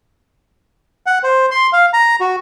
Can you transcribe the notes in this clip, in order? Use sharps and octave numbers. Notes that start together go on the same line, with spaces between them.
F#5
C5
C6
F5
A#5
F#4